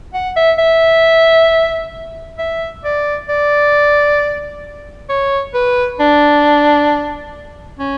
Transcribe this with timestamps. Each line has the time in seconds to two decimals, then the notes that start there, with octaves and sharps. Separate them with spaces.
0.14 F#5
0.36 E5
0.58 E5
2.38 E5
2.84 D5
3.29 D5
5.09 C#5
5.54 B4
6.00 D4
7.79 C#4